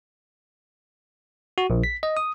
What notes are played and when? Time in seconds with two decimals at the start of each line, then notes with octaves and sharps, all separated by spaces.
1.58 F#4
1.70 A#1
1.84 B6
2.03 D#5
2.17 D#6